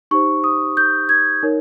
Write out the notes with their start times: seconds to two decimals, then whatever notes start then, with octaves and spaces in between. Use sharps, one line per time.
0.11 D#4 G4 C5 C#6
0.44 D#6
0.77 G6
1.09 G#6
1.43 D#4 A#4 C#5